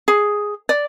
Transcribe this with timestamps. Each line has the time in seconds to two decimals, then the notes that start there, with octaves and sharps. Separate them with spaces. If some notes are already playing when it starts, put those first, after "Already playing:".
0.08 G#4
0.69 D5